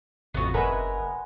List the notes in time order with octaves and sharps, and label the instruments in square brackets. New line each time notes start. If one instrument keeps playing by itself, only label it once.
[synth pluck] A1 F2 [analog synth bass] C3 [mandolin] B3 F#4
[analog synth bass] F#1 [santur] G#3 B3 [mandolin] A#4 [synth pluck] B4 C#5 E5